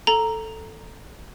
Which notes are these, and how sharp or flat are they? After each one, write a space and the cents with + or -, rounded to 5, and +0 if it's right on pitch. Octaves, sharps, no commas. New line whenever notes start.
A4 +0 A#5 +0